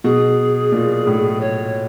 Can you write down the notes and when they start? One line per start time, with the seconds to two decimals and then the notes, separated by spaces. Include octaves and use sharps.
0.04 B2 G#4
0.72 A#2
1.07 A2
1.41 C#5